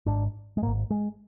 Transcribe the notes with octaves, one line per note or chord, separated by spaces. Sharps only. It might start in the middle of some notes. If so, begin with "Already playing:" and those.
G#1 G#2 D4
G#3
G#1 G#2 A#3
G#3